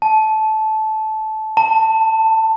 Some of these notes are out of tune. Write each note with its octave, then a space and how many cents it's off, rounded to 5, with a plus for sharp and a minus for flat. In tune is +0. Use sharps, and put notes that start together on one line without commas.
A5 -15
A5 +15